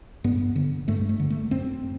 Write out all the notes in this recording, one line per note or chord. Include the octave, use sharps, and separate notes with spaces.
G2 B3
D3
G2 A3
A3
D3
A3
F#2 C4